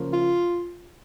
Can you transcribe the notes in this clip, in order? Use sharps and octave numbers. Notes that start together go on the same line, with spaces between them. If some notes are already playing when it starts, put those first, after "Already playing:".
Already playing: C#3 F3 A#3
F4